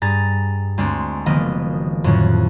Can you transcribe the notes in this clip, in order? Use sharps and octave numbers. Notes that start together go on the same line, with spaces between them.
G2 G#4 A#5 A6 A#6
D2 G#3 C4 D4
F#1 D#3 F3 A#3 B3 D#5
F2 A2 D3 F3 F#3